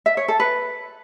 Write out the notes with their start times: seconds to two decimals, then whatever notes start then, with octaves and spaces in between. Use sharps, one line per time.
0.06 E5
0.17 C#5
0.28 A4
0.40 B4